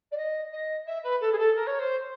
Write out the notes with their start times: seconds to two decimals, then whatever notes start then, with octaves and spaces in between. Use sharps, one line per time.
0.11 D5
0.17 D#5
0.52 D#5
0.86 E5
1.03 B4
1.20 A4
1.32 G#4
1.38 A4
1.55 A#4
1.66 C#5
1.78 C5